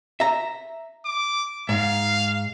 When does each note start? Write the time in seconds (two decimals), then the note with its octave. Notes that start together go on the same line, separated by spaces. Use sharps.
0.20 E5 A#5
1.05 D6
1.69 G#2 F5